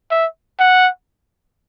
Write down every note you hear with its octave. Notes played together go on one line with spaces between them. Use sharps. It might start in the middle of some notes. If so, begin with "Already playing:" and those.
E5
F#5